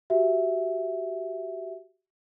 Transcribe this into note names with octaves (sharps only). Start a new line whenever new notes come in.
F#4 G4 E5